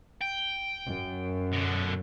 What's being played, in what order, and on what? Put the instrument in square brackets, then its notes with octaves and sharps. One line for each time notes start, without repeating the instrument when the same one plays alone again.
[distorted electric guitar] G5
[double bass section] F#2
[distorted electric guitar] B2 D3